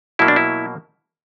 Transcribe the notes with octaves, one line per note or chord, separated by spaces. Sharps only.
B2 F#3 A#3 E4
D4
E4